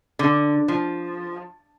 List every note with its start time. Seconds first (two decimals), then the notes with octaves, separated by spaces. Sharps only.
0.19 D3
0.68 F3